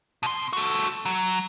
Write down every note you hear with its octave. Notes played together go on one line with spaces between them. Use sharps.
B2 C6
F#4 A4
F#3